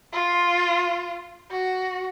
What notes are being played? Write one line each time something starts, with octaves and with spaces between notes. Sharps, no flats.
F4
F#4